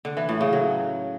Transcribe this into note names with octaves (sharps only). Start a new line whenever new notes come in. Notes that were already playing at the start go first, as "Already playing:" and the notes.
D3
E3
A2
C#3
F#3